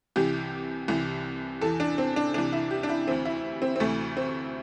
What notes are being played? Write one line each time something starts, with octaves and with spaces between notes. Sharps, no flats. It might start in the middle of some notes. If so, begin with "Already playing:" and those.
C2 C3 E3 G4
C2 C3 E3
E2 E3 A4
D4
C4
D4
C2 C3 E3 D4
E4
G4
D4
E4
D2 C3 E3 C4
E4
C4
C4
D2 C3 E3 A3
C4